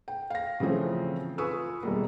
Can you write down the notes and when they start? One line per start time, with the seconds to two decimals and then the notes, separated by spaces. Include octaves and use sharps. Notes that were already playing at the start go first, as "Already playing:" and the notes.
0.08 G5
0.30 F5 A#6
0.60 C#3 E3 F3 A3 C4 C#4
1.38 F4 B4 G#5 C#6 D#6 E6
1.83 E1 G3 A#3